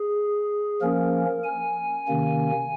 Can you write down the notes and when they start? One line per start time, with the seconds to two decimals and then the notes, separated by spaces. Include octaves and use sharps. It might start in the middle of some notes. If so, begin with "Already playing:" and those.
Already playing: G#4
0.81 F3 A#3 C#4 A#4
1.44 G#5
2.07 C3 D#3 A#3 C#4